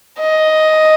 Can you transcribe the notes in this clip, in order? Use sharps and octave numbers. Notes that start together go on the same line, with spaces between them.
D#5